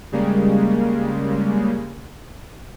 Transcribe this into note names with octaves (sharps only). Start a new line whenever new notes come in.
C#3 G3 G#3 A#3